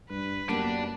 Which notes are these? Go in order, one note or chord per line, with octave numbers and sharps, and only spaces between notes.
G2 B4
F#2 G3 A#3 B3 D4